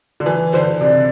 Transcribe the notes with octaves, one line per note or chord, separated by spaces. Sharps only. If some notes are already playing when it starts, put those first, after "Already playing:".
D3
E3 B4
D3 C5
C3 D5